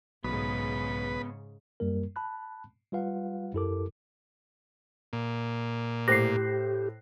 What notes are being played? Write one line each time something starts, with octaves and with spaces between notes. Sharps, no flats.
B1 G#2 C#3 B3 B4
F#2 G3 A#3 A#4
A5 B5 F#6
G3 F4 B4 F5 F#5
F#2 E4 G4 A4 A#4 D6
A#2
A2 G4 C5 F#6 A#6 C7